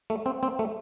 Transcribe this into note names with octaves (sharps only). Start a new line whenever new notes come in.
A3
C4
C4
A3